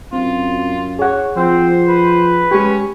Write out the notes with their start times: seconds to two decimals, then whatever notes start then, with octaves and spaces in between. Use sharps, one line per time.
0.13 F#2 C4 F4
0.99 G#4 C#5 F#5
1.37 F3 C4 C5
1.89 B4
2.51 G#3 C#4 G4